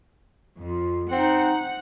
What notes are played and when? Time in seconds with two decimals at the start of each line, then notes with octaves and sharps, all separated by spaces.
0.61 F2 F4
1.11 C4 D#4 F#5